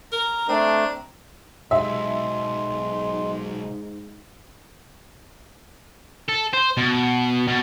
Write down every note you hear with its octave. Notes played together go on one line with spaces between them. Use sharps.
A#4 A#5
A3 C4 D4
B1 G#2 G#3 E5 C6
A4
C5
B2
B2